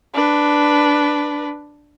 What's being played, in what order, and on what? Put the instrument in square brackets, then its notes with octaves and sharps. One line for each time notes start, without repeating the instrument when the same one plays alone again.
[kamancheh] D4 B4